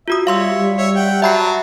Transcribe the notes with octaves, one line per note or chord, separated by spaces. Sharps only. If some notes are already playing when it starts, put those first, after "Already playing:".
F4 F#4 E5 D#6
G3 C#5 E5 F5 C6 E6
G3
C#5 E5
F#5 G5
F#3 E5 A5 B5 C7